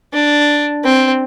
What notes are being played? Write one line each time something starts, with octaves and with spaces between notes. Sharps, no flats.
D4
C4